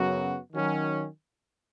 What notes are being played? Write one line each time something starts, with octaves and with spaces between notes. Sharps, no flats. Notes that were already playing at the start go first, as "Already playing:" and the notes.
Already playing: F#2 C#3 F#3 B3 F#4
D#3 F#3 C#4